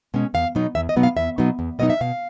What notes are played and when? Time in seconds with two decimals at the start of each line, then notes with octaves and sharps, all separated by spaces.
0.14 B2 G#3 C#4
0.34 E2 F5
0.55 B2 F#3 B3 D#4
0.75 E2 E5
0.89 D#5
0.96 B2 F#3 B3 D#4
1.03 F5
1.17 E2 E5
1.38 B2 F#3 B3 D#4
1.59 E2
1.79 B2 F#3 B3 D#4 D#5
1.90 E5
2.01 B2 F5